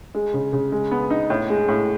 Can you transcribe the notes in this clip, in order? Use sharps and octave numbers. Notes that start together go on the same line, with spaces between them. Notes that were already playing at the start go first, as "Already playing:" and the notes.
G#3
C#3
C#3
G#3
B3
D#4
A2
G#3
A2